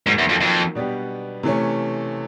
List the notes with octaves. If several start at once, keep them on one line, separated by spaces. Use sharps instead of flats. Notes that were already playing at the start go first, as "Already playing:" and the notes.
G#2 D#3 F#3 A#3
E2
F2
F2
B2 G3 B3 D4 G4
C3 E3 A3 C#4